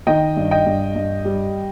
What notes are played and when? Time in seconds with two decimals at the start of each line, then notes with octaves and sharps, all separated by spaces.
0.07 D#3 D#5 G5
0.37 G2
0.51 D#5 G5
0.66 G2
0.95 G2
1.25 G3